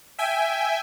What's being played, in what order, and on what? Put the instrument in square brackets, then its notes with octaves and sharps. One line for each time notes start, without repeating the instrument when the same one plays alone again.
[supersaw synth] E5 G5 G#5